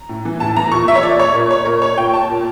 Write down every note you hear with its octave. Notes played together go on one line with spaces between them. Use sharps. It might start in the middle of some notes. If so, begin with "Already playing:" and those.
Already playing: A#5
A2
E3
A2 A5
E3 A#5
A#2 C#6
E5
C#5
A#2 D5
C#5
A#2 A#4
C#5
A#2 A#4
C#5
A#2 G5
A5
A#2